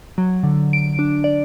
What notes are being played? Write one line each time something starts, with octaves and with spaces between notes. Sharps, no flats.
F#3
D3
D7
D4
D5